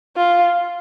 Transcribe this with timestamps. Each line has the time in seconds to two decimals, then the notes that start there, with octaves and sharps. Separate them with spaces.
0.17 F4